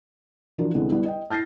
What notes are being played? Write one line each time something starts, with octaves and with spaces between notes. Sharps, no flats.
E3 F3 D4 F4 F#4 A#4
C2 D3 G#3 B3
G3 B3 E4
D#5 G5
F6 G6 A6 A#6 C7